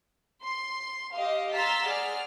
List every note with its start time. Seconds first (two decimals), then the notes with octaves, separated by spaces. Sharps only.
0.43 C6
1.14 G4 D#5 F5
1.54 A#5 C6 E6 F6 A6 B6
1.85 G#4 D5 F#5 F6